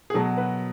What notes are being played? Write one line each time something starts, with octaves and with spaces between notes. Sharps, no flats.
G#4
B2 F#3 A4
B4